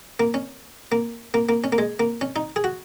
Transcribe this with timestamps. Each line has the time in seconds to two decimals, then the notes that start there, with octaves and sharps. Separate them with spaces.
0.20 A#3
0.34 C#4
0.92 A#3
1.34 A#3
1.49 A#3
1.64 C#4
1.72 A#3
1.78 G#3
2.00 A#3
2.21 C#4
2.36 D#4
2.56 G#4
2.64 F#4